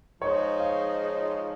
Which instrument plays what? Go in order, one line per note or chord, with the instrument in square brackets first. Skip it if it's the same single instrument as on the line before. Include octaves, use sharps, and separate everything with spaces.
[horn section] F3 G#3 D#4 [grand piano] C#5
[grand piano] F5